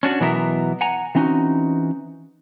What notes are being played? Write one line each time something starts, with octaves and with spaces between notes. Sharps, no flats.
C#4 D4 F#4
B2 E3 F#3 B3 A#4 E5
F#5 G#5 A#5
E3 C4 C#4 D#4 F#4